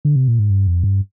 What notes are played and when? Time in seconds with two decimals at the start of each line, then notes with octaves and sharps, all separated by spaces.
0.05 D3
0.16 C3
0.28 A#2
0.39 G#2
0.50 G2
0.67 F2
0.84 G2